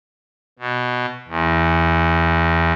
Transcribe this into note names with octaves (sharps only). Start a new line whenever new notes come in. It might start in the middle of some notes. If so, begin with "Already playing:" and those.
B2
E2